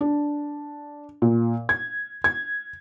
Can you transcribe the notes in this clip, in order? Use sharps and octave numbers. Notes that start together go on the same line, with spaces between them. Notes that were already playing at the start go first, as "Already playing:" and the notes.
D4
A#2
G#6
G#6